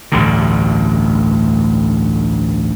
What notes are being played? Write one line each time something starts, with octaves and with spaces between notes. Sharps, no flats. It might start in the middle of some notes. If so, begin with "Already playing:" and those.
A1 D2 G2 D3